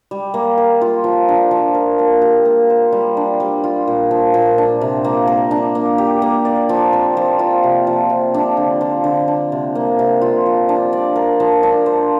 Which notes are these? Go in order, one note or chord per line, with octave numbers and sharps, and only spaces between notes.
G3
A#3
A#4
F4
F3
D4
F3
A#4
A#3
G4
A#3
C5
G3
D4
G3
F4
A#2
F3
A#2
D4
C3
A#3
A#4
D4
A#3
G4
A#3
D5
F3
C4
F3
F4
C3
F3
C3
D4
D3
F3
D3
D4
C3
A#3
C3
F4
F3
D4
D5
A#4
F3
D4
C5